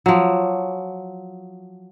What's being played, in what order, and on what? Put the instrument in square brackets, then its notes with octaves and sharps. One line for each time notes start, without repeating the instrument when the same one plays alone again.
[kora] F3 F#3